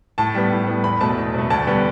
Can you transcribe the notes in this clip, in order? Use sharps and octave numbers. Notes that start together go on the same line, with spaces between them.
A2 A5
G3 B3
A2
G3 B3
E2 B5
B2 A3 A5
E2
B2 A3
D2 A5
D3 G3 B3